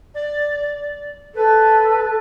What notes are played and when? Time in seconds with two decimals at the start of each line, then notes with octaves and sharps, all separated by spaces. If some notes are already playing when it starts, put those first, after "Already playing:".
0.14 D5
1.35 A4 B4